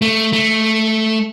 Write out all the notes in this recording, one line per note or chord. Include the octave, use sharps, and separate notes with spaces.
A3
A3